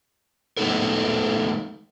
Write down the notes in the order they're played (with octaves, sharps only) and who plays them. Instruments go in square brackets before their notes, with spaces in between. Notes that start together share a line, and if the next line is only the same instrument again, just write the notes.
[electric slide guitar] G#3 A3 B3 D#4 A4 A#4